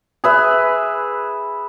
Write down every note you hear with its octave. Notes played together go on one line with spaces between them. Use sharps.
G#4 B4 E5